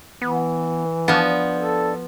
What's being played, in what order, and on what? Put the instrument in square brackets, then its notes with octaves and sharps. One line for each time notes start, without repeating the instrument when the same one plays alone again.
[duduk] E3 [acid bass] B3
[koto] F3 B3 [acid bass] D4
[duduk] A4